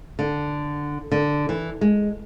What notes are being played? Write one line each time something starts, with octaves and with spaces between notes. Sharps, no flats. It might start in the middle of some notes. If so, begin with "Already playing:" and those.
D3
D3
E3
G#3